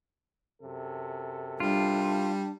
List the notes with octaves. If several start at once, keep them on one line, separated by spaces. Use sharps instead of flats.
F#2 C3 A4
G3 D4 F4